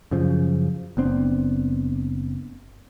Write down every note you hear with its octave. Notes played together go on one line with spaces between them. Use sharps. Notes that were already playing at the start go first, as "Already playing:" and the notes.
F#2 C#3 F3
F#1 B3 C4 D4